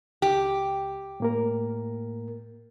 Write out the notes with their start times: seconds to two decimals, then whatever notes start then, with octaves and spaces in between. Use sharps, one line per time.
0.22 C#2 G4
1.20 A2 A#3 A#4